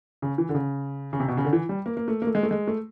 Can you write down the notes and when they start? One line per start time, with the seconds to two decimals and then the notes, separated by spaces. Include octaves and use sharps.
0.22 C#3
0.38 E3
0.49 D3
0.55 C#3
1.13 C#3
1.20 C3
1.28 B2
1.37 C#3
1.45 D3
1.53 E3
1.69 G3
1.86 A#3
1.97 A#3
2.08 A3
2.22 A#3
2.27 A3
2.35 G#3
2.43 A3
2.51 G#3
2.67 A3